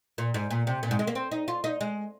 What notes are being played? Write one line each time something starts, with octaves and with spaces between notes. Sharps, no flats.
A#2
G#2
A#2
C3
A#2
G#2
G#3
A#3
C4
D#4
F4
D#4
G#3